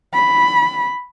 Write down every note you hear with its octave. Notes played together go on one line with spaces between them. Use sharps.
B5